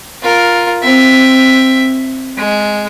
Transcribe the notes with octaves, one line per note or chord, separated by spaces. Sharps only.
F4 A#4
C4 E5
G#3